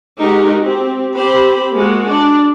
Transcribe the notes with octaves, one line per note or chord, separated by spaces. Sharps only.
G#3 D#4 F#4 G4 A#4
C4 G4
C4 G4 C5 B5
G#3 A#3 F#4
D4 D5